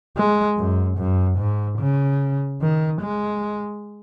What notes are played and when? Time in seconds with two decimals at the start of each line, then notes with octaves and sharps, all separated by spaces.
0.17 G#3
0.58 F#2
0.98 F#2
1.38 G#2
1.79 C#3
2.61 D#3
3.01 G#3